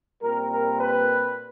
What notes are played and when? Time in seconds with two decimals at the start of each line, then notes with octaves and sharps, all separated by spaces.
0.21 A#2 G3 C4 A#4
0.51 A#4
0.80 B4